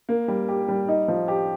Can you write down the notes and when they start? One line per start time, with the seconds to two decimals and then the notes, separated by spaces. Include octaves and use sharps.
0.09 A#3
0.28 G3
0.48 G4
0.68 G3
0.88 D#4
1.08 F3
1.28 G4